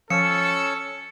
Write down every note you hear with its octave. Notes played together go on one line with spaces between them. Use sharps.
F3 C#4 A4 E6 C#7